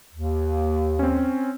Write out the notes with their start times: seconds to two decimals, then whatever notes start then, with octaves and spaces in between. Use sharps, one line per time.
0.13 D#2
0.99 C4 C#4